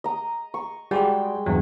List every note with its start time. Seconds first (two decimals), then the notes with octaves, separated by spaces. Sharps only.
0.04 D#5 A#5
0.54 C#6
0.91 G3 G#3 F#4 G4 G5
1.46 E2 G2 F#3